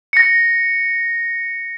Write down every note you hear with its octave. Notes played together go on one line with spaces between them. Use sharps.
A#6 C#7